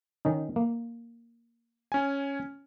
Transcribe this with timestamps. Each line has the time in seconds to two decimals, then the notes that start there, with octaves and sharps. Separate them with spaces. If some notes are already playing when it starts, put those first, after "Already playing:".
0.25 D#3 C#4 D#4
0.56 A#3
1.92 C#4 G#5